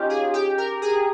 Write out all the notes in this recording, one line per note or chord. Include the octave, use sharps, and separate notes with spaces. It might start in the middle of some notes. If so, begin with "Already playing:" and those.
Already playing: C#4 D#4 F4 G4
G#4
G4
A#4
G#4